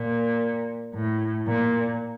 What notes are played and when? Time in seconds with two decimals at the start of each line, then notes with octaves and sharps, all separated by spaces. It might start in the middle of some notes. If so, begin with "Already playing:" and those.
Already playing: A#2
0.93 A2
1.46 A#2